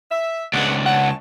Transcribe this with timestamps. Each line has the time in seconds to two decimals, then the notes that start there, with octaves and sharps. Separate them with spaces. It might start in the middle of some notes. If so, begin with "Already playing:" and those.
0.11 E5
0.53 C#2 G#2 D4 B4 F#5
0.86 C#5 F#5 G#5 A5